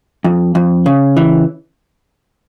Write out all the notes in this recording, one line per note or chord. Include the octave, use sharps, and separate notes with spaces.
F2
F2
C#3
E3